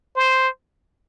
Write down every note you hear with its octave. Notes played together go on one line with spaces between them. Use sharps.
C5